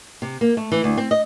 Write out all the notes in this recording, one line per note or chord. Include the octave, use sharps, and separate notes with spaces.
C3
A#3
A3
E3
D2
C4
D#5